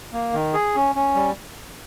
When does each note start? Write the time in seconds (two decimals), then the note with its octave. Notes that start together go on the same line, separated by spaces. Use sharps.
0.13 A#3
0.33 D#3
0.54 G#4
0.75 C#4
0.95 C#4
1.15 G3